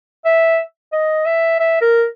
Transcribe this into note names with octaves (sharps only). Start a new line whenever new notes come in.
E5
D#5
E5
E5
A#4